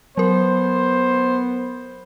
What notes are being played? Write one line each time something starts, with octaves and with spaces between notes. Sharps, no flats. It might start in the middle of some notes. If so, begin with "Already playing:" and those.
F#3 B3 A#4 C5